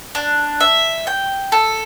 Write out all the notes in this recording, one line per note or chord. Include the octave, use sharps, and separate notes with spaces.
D4
E5
G5
A4